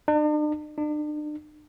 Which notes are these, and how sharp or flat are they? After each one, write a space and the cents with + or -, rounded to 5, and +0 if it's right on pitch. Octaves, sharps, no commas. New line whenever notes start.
D4 +45
D4 +40